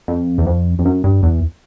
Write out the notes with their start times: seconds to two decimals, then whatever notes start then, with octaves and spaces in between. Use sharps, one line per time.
0.08 F2
0.38 E2
0.46 F2
0.79 F2
0.85 F#2
1.04 G2
1.23 E2